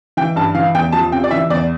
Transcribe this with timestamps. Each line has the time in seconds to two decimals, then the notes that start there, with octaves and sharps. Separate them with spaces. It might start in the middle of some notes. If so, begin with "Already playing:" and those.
0.17 E3 G5
0.36 G2 A5
0.55 E3 F5
0.74 E2 G5
0.92 F3 A5
1.12 C3 G5
1.24 D5
1.31 E3 E5
1.50 E2 D5